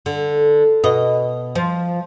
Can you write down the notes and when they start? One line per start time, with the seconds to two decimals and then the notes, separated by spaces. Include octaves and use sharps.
0.06 D3
0.84 B2 D#5
1.55 F3